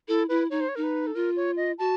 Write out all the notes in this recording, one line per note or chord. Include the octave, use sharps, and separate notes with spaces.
E4 A4
E4 B4
D#4 C#5
C5
C#5
D#4 A#4
B4
A4
F4 A#4
C#5
D#5
F#4 A5